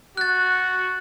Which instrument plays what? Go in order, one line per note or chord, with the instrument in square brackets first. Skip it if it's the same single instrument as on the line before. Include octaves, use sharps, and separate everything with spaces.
[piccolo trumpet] F#4 [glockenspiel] F#6 A6